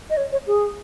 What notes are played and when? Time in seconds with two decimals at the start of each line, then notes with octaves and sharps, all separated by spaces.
0.10 D#5
0.17 C#5
0.32 C#5
0.47 G#4